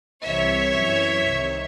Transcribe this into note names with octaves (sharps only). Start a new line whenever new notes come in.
C2 C3 E3 C#5 E5
F#2 E3
C2 C3 D#3